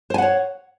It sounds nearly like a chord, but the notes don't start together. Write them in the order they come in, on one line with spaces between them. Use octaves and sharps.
C5 G#5 F#5 C#5